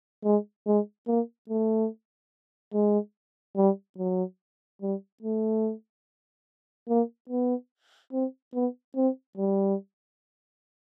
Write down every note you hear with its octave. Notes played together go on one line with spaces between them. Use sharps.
G#3
G#3
A#3
A3
G#3
G3
F#3
G3
A3
A#3
B3
C4
B3
C4
G3